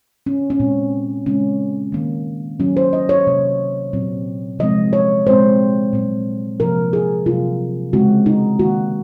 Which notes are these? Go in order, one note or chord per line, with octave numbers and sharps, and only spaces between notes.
C#4
C#4
A#2 G#3 C4
C#3 G#3 C4 C#4
D#3 A#3
D#3 F#3 A#3 C#4
C5
D#5
C#5
C3 F#3 A#3
A#2 F#3 C4
C3 F3 G#3 C4 D#5
C#5
A#2 G#3 C4 C5
A#2 F#3 C4
C3 F3 A#3 A#4
G#4
C3 F#3 A#3 F4
C#3 G#3 C4 F#4
D#4
D#3 A#3 F#4